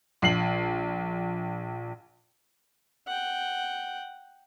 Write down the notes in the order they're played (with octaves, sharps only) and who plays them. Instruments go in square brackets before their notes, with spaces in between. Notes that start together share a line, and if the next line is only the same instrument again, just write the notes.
[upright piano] A#1 C7 F#7
[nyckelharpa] F#5 G5